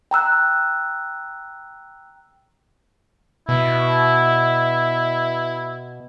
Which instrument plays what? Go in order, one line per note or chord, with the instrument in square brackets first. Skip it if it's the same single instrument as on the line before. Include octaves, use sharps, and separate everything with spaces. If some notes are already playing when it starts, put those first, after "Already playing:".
[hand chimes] G5 A#5 E6 F#6
[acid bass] B2 [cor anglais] E4